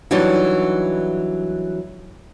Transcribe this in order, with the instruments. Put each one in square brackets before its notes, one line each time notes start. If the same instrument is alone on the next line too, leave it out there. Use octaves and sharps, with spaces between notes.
[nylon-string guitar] E3 F#3 G3 D4 D#4